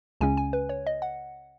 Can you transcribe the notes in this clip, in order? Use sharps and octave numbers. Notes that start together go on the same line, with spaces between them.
C#2 C#3 G#3 C#4 G#5
G#5
B4
C#5
D#5
F#5